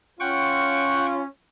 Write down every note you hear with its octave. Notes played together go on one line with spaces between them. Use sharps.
C#4 F4 F#5 G5 C#6